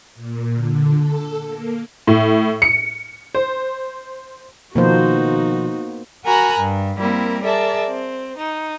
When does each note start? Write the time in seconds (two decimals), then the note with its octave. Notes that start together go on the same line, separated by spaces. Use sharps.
0.15 A#2
0.54 D3
0.98 A4
1.46 A#3
2.07 A2
2.62 C#7
3.35 C5
4.76 B2 D#3 F3 A#3 B3 D#4 F#4 C5
6.25 F#4 A#4 G#5 A#5 B5 F#6
6.59 G2
6.97 G3 A#3 C4 E4 A#4
7.43 G#4 A#4 D5 E5 A5
7.88 C4
8.36 D#4